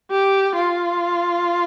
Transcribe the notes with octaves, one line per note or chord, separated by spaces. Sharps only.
G4
F4